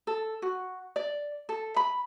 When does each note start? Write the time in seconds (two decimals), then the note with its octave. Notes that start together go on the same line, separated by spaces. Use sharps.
0.07 A4
0.42 F#4
0.96 D5
1.49 A4
1.76 B5